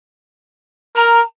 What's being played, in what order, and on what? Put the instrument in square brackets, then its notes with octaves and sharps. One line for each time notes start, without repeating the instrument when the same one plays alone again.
[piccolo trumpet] A#4 [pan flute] A#5